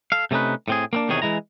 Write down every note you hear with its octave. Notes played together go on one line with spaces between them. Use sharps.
A4 F5
C3 A3 C#4 D#4 B4
A2 C4 G#4
A#3 C4 D4
E2 C3 D#3 G#4 C#5
E3 G#3 E4 A#5